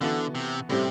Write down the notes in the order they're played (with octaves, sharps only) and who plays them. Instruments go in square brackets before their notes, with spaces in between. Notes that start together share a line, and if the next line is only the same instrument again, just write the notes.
[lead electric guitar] D3 [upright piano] E3 B3 F#4 A4
[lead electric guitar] C3
[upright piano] A2 G3 C4 G4 [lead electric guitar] C3